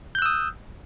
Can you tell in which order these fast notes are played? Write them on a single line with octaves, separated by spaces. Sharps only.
G6 F#6 E6 D#6